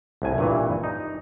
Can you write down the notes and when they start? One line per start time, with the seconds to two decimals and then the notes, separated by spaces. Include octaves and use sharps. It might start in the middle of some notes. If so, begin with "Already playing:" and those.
0.22 C2 A2 G#5
0.38 G2 A#2 E3
0.83 D#4